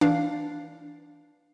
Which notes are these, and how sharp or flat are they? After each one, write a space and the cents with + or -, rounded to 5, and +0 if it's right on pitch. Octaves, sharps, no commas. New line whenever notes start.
E3 -5 D4 +0 F5 +0